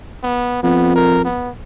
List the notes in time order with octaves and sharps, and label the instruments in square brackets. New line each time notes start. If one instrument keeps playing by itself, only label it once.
[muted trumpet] B3
[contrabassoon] F2 [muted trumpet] B3
[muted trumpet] A#4
B3